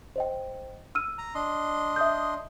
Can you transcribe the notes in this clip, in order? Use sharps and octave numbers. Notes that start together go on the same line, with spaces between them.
C5 D#5 G5
E6 F6 D#7
A#5
D4 D#5 C6
E5 D#6 G6